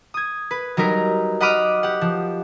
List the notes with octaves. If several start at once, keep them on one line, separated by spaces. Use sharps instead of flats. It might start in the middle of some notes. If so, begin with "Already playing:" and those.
D#6 G#6
B4
F#3 G3 D#4 A#4 B4
D#5 F#5 B5 D6 D#6 F6
G4 F#5
F3